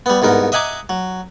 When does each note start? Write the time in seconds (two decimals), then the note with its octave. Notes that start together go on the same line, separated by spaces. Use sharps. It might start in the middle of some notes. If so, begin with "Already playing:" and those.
0.06 G3 B3
0.22 C2 G#2 B3 A#4
0.52 D#5 E5 F#5 G#5 A#5 D6
0.89 F#3